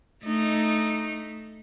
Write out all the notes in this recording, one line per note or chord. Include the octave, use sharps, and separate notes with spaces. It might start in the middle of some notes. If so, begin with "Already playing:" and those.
A3 D#4